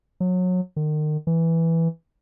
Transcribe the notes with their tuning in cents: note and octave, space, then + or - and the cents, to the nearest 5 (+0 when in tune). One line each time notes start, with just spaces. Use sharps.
F#3 -25
D#3 -35
E3 +0